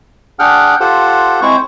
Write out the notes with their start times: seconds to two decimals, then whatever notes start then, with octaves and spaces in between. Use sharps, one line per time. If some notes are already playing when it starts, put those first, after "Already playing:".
0.39 D4 G#4 F#5 G5 F6
0.80 F4 G4 A4 C5 F#5
1.42 G#3 C4 E4 C5 C#6